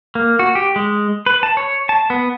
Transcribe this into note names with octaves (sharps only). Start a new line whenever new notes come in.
A#3
F#4
G4
G#3
B4
A5
C#5
A5
B3